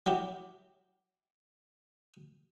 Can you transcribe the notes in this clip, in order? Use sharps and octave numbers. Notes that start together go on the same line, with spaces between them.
F#3 E4 G4